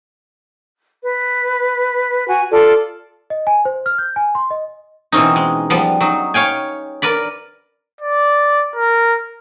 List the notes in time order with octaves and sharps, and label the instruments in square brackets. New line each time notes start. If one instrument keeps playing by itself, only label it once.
[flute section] B4
F#4 G#5
F4 A4 D5
[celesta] D#5
G#5
C5
F6
G6
G#5
C6
D#5
[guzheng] B2 E3 C4 C#4 D#4
G#3
F3 G3 B3
F#3 D#4
C#5 F5 G5 G#5
A#4 B4 D5 B5
[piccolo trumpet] D5
A#4